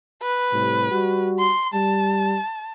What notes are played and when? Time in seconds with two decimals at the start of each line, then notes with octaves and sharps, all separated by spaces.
0.22 B4
0.52 A2 C3 G3
0.92 G3 F#4
1.39 C6
1.74 G3 A5